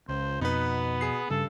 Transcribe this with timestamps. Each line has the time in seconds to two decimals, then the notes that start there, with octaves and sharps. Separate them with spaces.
0.08 C#2 C5
0.41 F2 B2 B3 D#4 B4
1.01 G#4 C7
1.30 G2 C#3 A4